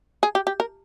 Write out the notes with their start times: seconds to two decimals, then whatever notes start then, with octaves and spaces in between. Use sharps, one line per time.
0.23 G#4
0.35 G4
0.47 G4
0.60 A#4